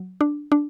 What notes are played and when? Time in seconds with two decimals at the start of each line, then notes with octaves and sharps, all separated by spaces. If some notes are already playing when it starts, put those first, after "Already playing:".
Already playing: F#3
0.21 D4
0.52 D4